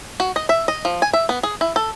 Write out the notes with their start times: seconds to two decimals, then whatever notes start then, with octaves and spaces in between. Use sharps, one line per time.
0.20 F#4
0.36 D#5
0.49 E5
0.68 D#5
0.85 F3
1.02 G#5
1.13 E5
1.29 B3
1.43 G#4
1.61 E4
1.76 A4